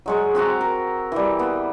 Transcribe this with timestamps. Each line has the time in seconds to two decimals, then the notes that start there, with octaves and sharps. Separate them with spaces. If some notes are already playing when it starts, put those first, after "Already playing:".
0.06 F#3 G#3 C#6
0.35 C4 F#4 A5 A#5
0.61 A#4
1.12 E3 G3
1.39 B3